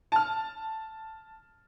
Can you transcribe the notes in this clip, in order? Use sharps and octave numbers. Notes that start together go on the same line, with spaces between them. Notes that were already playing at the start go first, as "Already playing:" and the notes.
A5 F6